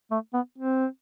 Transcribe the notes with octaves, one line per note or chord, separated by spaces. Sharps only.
A3
B3
C4